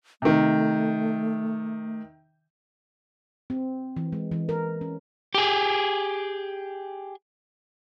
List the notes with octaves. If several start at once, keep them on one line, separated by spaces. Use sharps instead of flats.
C3 D#3 A3
C4
E3
G#3
E3
A#4
C#4
G4 G#4